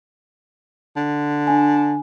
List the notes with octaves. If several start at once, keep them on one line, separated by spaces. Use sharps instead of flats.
D3
D4 G#5